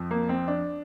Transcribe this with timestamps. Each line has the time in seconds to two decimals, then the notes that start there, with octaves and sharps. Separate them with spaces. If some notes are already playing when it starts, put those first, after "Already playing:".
Already playing: F2 F3
0.11 A#3
0.29 C4
0.48 D4